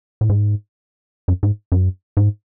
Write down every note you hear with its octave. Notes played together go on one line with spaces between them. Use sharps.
A2
G#2
F#2
G#2
F#2
G#2